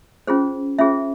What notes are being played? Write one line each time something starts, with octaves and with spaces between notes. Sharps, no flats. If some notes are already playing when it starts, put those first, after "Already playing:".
C#4 F4 G#4 C5
C#4 F4 G#4 C5 E5